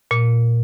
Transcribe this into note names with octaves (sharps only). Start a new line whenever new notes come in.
A#2